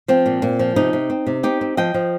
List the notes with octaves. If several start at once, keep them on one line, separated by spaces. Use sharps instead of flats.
F3 C4
A#2
A#2
F3
C3 D#4
C3
C4
C3
C4 D#4 G4
C4
F3 D#5 G5
F3